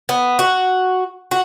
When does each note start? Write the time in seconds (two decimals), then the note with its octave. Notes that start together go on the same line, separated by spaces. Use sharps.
0.09 B3
0.39 F#4
1.31 F#4